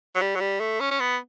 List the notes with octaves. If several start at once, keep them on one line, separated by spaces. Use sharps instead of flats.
F#3
G3
F#3
G3
A3
C#4
C#4
B3